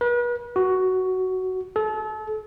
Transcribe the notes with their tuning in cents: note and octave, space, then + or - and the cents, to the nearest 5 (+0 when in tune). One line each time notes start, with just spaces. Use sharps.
B4 -40
F#4 +10
A4 -35